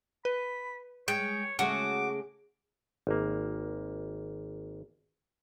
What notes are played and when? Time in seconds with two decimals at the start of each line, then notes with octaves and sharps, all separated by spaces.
0.25 B4 B5
1.08 G#3 C#5 G5
1.59 C#3 G#3 A3 F#4 D6
3.07 G#1 A#3